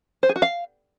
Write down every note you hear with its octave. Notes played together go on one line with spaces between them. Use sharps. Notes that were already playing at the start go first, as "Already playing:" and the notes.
C5
G#4
F#4
F5